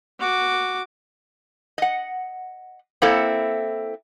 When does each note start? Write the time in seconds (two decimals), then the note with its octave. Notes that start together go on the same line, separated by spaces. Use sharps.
0.20 F#4 D6
1.78 D#5 F#5
3.02 A#3 C4 E4 A4